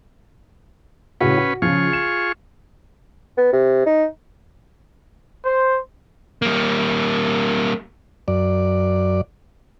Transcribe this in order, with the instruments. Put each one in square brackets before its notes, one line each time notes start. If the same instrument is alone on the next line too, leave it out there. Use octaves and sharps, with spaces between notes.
[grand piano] A2 C#3 F#4 [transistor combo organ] C#4 B4
[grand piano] F#4
[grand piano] C#3 F3 [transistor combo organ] F4 G#4 C#6
[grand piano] E7
[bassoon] B3
C3
D#4
[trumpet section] C5
[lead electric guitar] G3 A#3
[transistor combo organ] F#2 D5